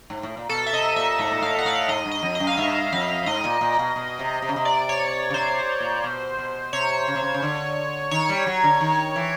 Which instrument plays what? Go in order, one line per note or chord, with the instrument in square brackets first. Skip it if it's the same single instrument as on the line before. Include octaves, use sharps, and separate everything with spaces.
[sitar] G#2
A2
A#2
[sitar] B2 [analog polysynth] A4
[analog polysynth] E5
[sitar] C3 [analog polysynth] D#5
[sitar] A#2 [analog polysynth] E5
[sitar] G#2 [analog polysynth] E5
[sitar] A#2
[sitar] A2 [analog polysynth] F5
[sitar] A#2 [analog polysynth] F#5
[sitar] A2 [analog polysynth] F5
[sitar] G#2 [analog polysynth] D#5
[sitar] G2
[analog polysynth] D#5
[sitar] F2
[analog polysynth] D#5
[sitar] F#2
[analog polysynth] F5
[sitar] G2 [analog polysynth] E5
[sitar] F2 [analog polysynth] F5
[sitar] G#2 [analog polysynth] D#5
[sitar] A#2
A#2
B2
B2
C3
C3
C#3
C3
[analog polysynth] D5
C#5
[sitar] C#3
[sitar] C3 [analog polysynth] C5
[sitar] A#2
B2
B2
[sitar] C3 [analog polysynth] C#5
[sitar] C#3
C3
C#3
C#3
D3
[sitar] D#3 [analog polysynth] C#5
[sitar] G3
F#3
D3
D#3
E3